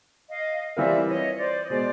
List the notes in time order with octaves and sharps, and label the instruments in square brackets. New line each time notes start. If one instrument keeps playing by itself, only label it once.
[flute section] D#5 F5
[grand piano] E3 G3 C4 F4 A#4 [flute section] D5 E5
[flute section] C#5 D#5
C5 D5
D#5
[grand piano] B2 G#3 [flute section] C5 D5